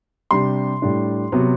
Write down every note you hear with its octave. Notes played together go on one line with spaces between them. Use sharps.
C3 G3 D4 C6
A2 G3 D4
C3 F#3 B3